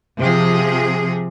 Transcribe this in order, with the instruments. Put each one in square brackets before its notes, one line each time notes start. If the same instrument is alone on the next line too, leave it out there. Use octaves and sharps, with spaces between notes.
[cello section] C3 F3 G#4